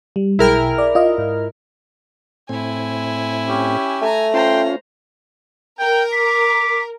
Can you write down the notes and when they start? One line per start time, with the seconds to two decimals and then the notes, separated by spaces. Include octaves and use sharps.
0.16 G3
0.39 B1 E4 G#4 A#4 G5 F6
0.78 D5
0.95 F4 D#5
1.18 G#2
2.49 A2 C4 E4 G#5
3.48 C#4 G4
4.01 A3 G#5 A#5
4.34 C#4 F4 C5 G5 A#5 C6
5.79 A#4 G5
6.12 D6 B6